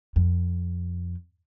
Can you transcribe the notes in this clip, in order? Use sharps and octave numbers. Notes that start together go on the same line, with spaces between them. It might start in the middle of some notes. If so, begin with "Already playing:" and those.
F2